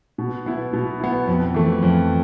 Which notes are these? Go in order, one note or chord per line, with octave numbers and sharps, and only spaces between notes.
B2
B3 E4
B2
B3 E4
F2
E3 A3
F2